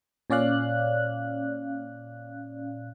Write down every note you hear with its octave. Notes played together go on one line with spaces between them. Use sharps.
A#2 C#4 D5 F5 F#6